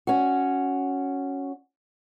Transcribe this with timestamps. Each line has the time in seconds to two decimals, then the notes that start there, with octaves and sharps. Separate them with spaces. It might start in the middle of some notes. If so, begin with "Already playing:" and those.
0.07 C#4 F#4